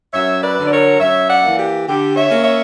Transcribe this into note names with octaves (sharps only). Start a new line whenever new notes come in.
F#2 C#5 E5
B4 D5
D3 F#3
D5
A#4 C#5
F#2 C#5 E5
D5 F#5
E3 A#3
G4
D3 G4
C#5 E5
A#3 C#4
C#5 E5